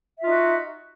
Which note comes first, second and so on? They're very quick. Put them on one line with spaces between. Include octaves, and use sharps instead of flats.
E5 F4 D#4 F#4